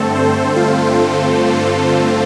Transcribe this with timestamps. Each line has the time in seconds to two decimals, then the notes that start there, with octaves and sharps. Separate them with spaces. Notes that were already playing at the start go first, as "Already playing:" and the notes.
Already playing: G2 D3 A3 C4 A4
0.15 C5
0.56 F4